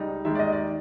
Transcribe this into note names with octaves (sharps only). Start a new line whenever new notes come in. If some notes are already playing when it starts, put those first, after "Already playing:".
Already playing: C#2 G3 D#4
D#2 D#3 G#3 E5
D5
D#5
D5